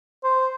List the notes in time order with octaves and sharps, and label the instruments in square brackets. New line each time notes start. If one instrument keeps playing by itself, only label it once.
[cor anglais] C5